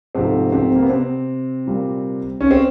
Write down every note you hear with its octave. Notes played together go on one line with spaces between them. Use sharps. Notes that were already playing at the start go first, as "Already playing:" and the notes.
G#2 C3 F3 A3 C4
C3 C4
A#3
B3
C3 C4
A#2 G3 A#3
C#4
C4